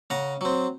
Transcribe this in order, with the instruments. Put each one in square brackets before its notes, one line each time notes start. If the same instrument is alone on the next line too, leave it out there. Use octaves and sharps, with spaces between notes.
[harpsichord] C#3 F#5 A#5
F#3 C4